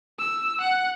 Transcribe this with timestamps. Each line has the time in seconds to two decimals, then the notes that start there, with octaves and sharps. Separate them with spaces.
0.19 E6
0.61 F#5